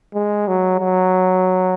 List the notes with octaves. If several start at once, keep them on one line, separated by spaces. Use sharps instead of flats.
G#3
F#3
F#3